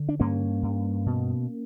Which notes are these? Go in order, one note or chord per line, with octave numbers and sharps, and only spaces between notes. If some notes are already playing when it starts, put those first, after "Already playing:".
Already playing: D3
D4
G2 A#3 C#4
G2
B2